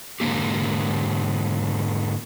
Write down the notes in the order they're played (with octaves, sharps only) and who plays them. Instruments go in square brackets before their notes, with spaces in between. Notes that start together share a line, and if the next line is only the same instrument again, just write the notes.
[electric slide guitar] G#2 D3 D#3 A#3 G4